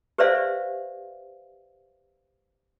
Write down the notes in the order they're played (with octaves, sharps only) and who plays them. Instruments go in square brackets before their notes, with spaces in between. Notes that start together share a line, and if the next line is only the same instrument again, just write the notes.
[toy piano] G4 B4 C5 D5 E5 F5